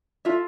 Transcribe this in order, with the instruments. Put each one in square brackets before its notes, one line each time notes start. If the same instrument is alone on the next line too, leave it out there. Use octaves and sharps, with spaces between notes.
[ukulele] F4 A4 E5